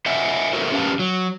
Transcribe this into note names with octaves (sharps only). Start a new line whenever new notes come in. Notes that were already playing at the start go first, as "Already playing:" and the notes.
C5 D#5 E5 F#5 G#5
F#4 A4 A#4 C5 E5
C#4 G4 A#4 B4 F5 A5
F#3